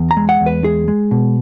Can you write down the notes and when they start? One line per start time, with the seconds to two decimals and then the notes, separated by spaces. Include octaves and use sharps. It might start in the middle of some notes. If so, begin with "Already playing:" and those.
Already playing: E2
0.11 A#5
0.17 G#3
0.29 F#5
0.41 E2
0.46 B4
0.64 G#3 G#4
0.88 G#3
1.11 B2